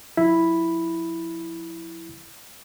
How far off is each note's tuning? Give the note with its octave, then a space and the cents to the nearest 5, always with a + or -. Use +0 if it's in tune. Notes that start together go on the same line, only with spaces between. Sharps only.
F3 +40 E4 +0 B5 +0